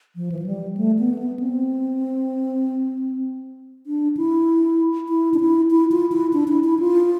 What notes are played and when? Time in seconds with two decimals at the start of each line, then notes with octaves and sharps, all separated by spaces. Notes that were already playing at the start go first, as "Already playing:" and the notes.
0.16 F3
0.32 E3
0.39 F3
0.46 G3
0.77 A3
0.98 B3
1.14 A3
1.19 B3
1.40 C4
3.87 D4
4.17 E4
5.09 E4
5.34 D4
5.40 E4
5.71 E4
5.92 F4
6.12 E4
6.33 D4
6.48 E4
6.64 E4
6.80 F4